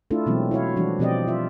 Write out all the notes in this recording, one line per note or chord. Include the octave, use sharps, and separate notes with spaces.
A3 D4 E4 F4 A4
B2 E3 F#3 G#3 B3 C4
E4 F#4 C#5 F5
E3 F3 G3 D4 F#4
B2 F3 C4 G4 D5 D#5
F4 E5